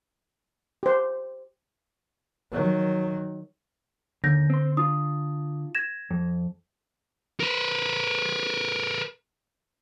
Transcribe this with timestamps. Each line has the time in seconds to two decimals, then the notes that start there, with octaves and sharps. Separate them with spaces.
0.83 G4 C5
2.51 D#3 F#3
4.24 D#2 D3 G6 A#6
4.50 C4 C6
4.77 D4 F4 D#6
5.75 G#6 A#6 E7
6.11 F2
7.40 A#4 B4